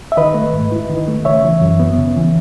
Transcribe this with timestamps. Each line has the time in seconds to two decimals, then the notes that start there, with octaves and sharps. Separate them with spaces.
0.12 E5
0.17 D#3 B4 D#5
0.34 A3
0.53 G#2
0.72 E4
0.90 D#3
1.08 A3
1.25 C#3 C#5 E5
1.44 E3
1.61 F#2
1.80 B3
1.98 C#3
2.17 E3